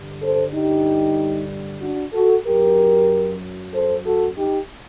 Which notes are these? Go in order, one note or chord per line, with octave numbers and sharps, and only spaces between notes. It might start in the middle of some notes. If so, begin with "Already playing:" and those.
Already playing: G2 D3 G3
A4 C5
D#4 G4
D4 F#4
F#4 A4
F#2 F#3 G4 A#4
A4 C5
F#4 A4
D#4 G4